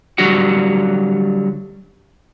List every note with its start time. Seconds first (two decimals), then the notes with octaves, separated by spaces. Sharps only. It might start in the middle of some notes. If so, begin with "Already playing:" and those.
0.18 D3 F#3 G3 F#4 F#5